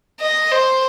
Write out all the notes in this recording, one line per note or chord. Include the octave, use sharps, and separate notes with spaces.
D#5
C5